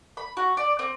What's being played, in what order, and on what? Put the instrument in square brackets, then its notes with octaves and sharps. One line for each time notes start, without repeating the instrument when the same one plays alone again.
[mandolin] B5
F#4
D5
C4